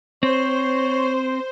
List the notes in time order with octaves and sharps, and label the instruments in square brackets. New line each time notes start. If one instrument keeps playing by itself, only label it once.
[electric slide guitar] C4 [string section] C5 [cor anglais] C#5